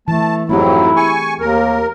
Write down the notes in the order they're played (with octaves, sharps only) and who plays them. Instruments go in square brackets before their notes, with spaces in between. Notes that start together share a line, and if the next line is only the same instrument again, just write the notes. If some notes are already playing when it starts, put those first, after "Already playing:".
[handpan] E3 [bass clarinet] A3 [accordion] A5
[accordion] F2 G#2 F#3 [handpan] A3 C4 G4 [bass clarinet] E4
[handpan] G#4 [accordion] G#5 C#6
[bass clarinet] D#2 [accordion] A#4